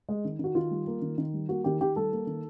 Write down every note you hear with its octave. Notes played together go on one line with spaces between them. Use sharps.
G#3
D#3
D#3 F#4
D#3 F4
G3
A#3
D#3
D#3
G3
A#3 F#4
D#3 G4
D#3 G4
G3 A4
A#3
D#3